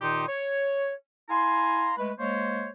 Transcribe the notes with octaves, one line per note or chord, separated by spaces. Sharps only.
A#2 D#3 D#4 G4 C6
C#5
E4 F5 G#5 A#5 C6
G#3 A3 B4
G#3 A#3 C5 C#5